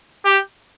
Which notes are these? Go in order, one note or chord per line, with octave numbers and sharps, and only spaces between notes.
G4